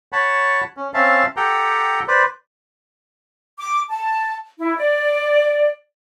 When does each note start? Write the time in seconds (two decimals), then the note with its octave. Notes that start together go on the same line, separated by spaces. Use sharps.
0.13 C#5 F#5 A5 B5
0.77 C#4
0.94 C4 C#4 E5 F5 A5
1.37 G4 A4 F#5 G5 A#5
2.08 B4 C5 D5
3.58 D6
3.89 A5
4.58 E4
4.77 D5